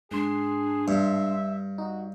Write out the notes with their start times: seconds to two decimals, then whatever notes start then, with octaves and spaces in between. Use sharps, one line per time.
0.11 G#2 D4 G#4 C6 C7
0.88 G2 E5
1.78 D#4 F#4